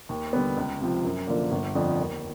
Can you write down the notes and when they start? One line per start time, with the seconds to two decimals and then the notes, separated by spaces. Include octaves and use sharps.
0.09 D#2
0.33 D3 G3 B3
0.57 C#2
0.80 C3 F3
1.04 F#2
1.27 D3 F3 A#3
1.51 G1
1.75 F2 D3 F3
1.98 D#2